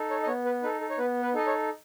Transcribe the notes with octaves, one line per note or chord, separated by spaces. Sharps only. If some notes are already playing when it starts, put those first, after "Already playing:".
Already playing: D#4 A4
C#5
D#5
B3 C#5
B4
D#4 A4 B4
A4
C#5
B3 B4
B4
D#4 A4 D#5
C#5